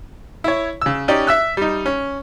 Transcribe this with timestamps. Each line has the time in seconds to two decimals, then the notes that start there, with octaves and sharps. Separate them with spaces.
0.44 E4 C#5
0.82 C#3 E6
1.08 C#4 D#4 G4 D5
1.27 E5 E6 F#6
1.57 G3 D#4
1.86 C#4